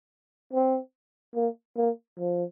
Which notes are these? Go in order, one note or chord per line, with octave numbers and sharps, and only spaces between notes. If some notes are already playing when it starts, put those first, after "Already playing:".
C4
A#3
A#3
F3